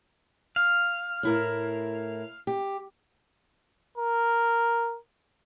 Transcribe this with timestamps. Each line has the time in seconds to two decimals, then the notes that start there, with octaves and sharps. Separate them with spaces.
0.56 F5
1.23 A2 E4 A#4
2.47 G4
3.98 A#4